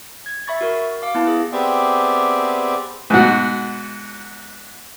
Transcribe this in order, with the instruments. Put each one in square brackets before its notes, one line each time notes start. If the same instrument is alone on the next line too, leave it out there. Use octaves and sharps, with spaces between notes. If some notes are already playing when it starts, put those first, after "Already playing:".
[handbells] G#6
E5 B5 C#6 A6
F#4 A#4
F5 D6
B3 E4 F5 A5
G#4
[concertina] B3 C4 G4 G#4 D5 E5
[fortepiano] G#2 B2 F#4